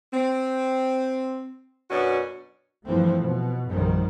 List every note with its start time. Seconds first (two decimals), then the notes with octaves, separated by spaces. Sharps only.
0.14 C4
1.90 F#2 B2 C#4 D4 F#4
2.86 G2 E3 F3 A3 C4
3.20 B2
3.69 A#1 F#2 C3 D#3 G3